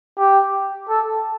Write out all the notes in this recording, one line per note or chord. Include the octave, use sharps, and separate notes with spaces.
G4
A4